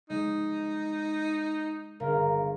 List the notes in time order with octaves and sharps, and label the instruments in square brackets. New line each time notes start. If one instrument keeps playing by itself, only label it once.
[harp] G#3 [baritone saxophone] D#4
[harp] G1 [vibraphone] G#4 F5 [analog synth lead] A#4